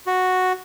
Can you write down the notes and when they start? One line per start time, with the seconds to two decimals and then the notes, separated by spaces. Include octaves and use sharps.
0.07 F#4